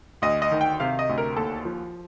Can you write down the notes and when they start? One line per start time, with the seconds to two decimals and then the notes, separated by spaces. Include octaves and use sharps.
0.22 D2 D#5
0.42 D#5
0.52 D#3
0.61 G5
0.80 C3 F5
0.99 D#5
1.09 D2
1.18 A#4
1.37 D#2 A4
1.65 F3